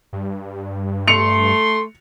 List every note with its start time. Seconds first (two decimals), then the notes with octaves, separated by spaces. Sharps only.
0.13 G2
1.08 A3 C6 C#7 F7